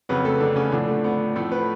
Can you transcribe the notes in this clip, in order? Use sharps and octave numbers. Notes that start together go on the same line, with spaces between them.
F2 C#3 F#3 B3 B4
A3 A4
D3 D4
C#3 C#4
A2 D3 F3 D4
A3
B3
A2 F3 A3 A4
B3 B4